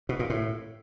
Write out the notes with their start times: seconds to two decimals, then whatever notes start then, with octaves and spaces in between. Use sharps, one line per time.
0.09 B2
0.19 A#2
0.30 A2